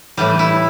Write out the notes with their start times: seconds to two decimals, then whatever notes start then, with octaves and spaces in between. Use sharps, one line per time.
0.17 A2 E3 G3
0.39 E4